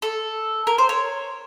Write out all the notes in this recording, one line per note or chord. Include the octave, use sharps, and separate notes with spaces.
A4
A#4
C5
C#5